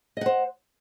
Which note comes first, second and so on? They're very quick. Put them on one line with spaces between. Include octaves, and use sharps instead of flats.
D#5 F#5 C5